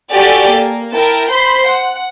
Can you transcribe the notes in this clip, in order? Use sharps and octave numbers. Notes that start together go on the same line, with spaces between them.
F#4 G4 A4 D5 G#5
A#3
E4 A#4 G5 A5
C5 B5 G6 C7
F#5